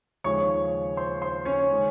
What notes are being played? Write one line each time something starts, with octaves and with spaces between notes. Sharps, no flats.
D#2 C#3 F3 G#3 C#5 C#6
C5 C6
C5 C6
C#4 C#5
D#3 G#3